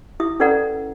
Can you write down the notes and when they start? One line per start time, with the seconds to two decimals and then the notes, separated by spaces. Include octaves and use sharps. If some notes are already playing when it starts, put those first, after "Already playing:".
0.20 E4 E5 D#6
0.40 C#4 A4 B4 D5 F#5 A#5